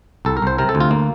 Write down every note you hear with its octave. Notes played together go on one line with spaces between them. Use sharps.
C2 A4
A#4
C2 C5
C3 A#4
A4
D2
F4
A#3